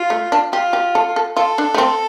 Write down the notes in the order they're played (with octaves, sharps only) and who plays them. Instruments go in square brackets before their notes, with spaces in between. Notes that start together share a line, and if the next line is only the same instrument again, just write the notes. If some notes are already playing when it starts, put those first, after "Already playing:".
Already playing: [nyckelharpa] F4
[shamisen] A3
D4
[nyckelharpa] F4 [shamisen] G4
[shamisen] G4
A4
A4
[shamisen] F4 [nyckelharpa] A4
[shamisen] D4
A3
C4